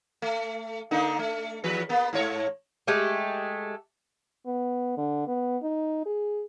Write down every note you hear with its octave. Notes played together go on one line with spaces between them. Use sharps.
A3
D3 A#3 D#4
A3
E2 F3 B4
A#3 B3
G#2 A3 C#5
G#3 A3 G4
B3
D3
B3
D#4
G#4